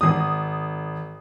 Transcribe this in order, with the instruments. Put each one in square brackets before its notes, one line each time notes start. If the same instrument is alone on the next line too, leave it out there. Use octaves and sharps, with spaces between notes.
[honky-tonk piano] G#1 D#6